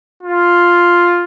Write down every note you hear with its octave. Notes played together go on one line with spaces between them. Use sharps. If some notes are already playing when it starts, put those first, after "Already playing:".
F4